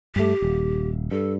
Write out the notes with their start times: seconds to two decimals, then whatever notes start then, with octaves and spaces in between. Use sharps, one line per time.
0.16 G2 A3 G4
0.42 D#1
1.11 G2 A4